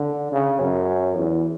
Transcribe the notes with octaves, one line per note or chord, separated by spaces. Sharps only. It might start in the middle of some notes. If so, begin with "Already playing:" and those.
Already playing: D3
C#3
F#2
E2